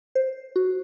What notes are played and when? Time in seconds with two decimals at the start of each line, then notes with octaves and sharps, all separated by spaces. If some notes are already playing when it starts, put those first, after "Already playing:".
0.15 C5
0.56 F#4